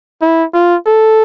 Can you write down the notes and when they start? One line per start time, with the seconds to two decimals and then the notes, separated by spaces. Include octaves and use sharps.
0.21 E4
0.54 F4
0.86 A4